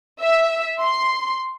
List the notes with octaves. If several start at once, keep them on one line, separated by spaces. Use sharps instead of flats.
E5
C6